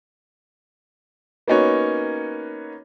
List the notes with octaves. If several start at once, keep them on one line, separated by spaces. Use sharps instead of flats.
A#3 B3 C#4 D#4 F#4 C#5